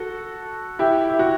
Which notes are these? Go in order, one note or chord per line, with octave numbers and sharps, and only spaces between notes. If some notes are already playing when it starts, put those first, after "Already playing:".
Already playing: F#4 A4
E4 G4
E4
F#4